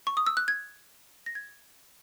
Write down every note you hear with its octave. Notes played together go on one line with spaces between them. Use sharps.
C#6
D#6
E6
F#6
G#6
A#6
G#6